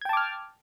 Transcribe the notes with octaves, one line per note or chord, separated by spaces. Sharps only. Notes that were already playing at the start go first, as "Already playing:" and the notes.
G5 A5 D6 F6 G#6